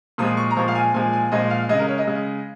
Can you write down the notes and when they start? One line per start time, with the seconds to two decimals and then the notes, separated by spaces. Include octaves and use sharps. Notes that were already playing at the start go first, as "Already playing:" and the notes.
0.18 A#2 F3 G#3 D#6
0.37 C#6
0.51 A#5
0.56 A#2 F3 G#3 C#6
0.68 F5
0.75 G#5
0.94 A#2 F3 G#3 G#5
1.13 G#5
1.32 A#2 F3 G#3 D#5
1.50 F5
1.69 G#3 D#5
1.73 C#3
1.79 A#4
1.88 C#5
1.98 D#5
2.07 C#3 G#3